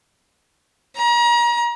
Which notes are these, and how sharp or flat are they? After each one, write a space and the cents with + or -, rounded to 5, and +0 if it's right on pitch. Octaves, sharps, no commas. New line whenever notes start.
A#5 +35